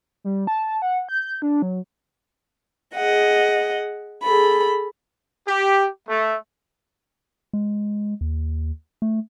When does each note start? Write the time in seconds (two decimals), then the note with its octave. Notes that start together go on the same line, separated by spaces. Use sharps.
0.24 G3
0.47 A5
0.82 F#5
1.09 G6
1.42 D4
1.62 F#3
2.96 G#4 D#5 F#5
4.23 G#4 A4 B5
5.48 G4
6.08 A3
7.53 G#3
8.21 D#2
9.02 A3